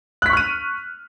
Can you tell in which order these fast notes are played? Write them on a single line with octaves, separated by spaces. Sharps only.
F#6 B6 C#6 F6 D#7